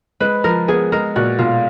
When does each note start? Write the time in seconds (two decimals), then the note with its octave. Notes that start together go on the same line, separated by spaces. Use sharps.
0.20 G#3 B4
0.44 F3 A#4
0.68 B3 G#4
0.92 G#3 A#4
1.16 A#2 F#4
1.39 B1 F4